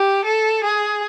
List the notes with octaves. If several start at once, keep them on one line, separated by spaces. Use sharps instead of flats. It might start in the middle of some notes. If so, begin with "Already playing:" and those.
Already playing: G4
A4
G#4